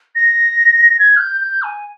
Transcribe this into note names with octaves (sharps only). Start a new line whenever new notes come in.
A#6
G#6
F6
G6
G6
G#5